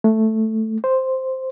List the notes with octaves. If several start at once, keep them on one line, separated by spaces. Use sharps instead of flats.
A3
C5